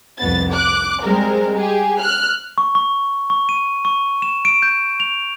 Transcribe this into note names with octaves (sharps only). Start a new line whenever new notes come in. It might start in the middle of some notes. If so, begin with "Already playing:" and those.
C2 F2 B3 A6
D6 F#6
G3 G#3 C4 A#4
G4 G#4
F6 F#6
C#6
C#6
C#6
D#7
C#6
E7
D7
G6
F7